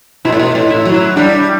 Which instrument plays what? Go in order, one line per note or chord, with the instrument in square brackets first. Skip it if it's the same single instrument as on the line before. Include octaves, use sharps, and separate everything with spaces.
[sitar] B2 [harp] E4
[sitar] A2
B2
A2
[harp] E4
[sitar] F#3
[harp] E4
[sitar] G3 [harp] D4